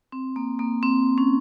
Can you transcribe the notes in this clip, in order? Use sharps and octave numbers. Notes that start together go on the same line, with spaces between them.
C4
A#3
A#3
C4
C#4